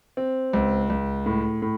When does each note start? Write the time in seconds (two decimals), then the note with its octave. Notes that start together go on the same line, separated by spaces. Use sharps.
0.17 C4
0.53 C#2
0.90 C#2
1.26 A2
1.62 A2